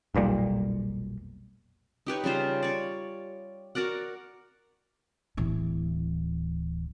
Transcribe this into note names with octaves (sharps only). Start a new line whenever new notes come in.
F1 B1 A#2 G3
D#4 G4 B4 C#5
C#3 G3 F4 C5
C#5 D5
F#4 A#4 D5 F#5
D1 E3